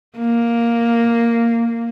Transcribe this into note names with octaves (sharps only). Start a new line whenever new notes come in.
A#3